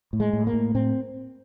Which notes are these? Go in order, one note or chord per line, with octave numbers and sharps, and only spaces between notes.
A2
G#3
A2
A#3
A2
A2 C4